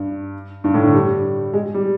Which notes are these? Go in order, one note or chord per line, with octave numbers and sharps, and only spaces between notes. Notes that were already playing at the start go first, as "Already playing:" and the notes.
Already playing: G2
G2
A2
D3
G3
G#3
G3